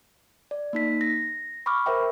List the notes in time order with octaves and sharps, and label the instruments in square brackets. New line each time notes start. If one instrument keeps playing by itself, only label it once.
[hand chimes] D5
A#3 D#4 B6
A#6
B5 C#6 D6 F6
A#4 C5 E5 G5